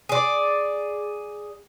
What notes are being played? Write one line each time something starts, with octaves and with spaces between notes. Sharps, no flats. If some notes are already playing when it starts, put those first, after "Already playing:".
G#4 D5